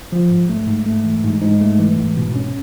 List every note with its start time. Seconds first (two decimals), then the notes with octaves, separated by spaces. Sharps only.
0.12 F3
0.30 G#2
0.49 A3
0.67 G#2
0.86 A3
1.05 E3
1.24 G#2
1.42 G#2
1.61 A3
1.79 E3
1.97 G#2
2.17 B2
2.36 C#4